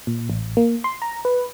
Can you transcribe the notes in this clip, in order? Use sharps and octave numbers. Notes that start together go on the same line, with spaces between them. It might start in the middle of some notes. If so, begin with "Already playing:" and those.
A#2
A1
A#3
C6
A#5
B4